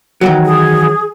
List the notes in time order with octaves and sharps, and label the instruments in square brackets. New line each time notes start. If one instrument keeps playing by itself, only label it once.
[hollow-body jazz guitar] D#3 E3 F#3
[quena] G#4